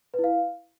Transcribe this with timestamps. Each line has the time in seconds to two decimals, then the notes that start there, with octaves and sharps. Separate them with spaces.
0.14 B4
0.19 E4
0.24 F5